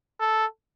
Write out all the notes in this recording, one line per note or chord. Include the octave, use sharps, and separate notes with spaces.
A4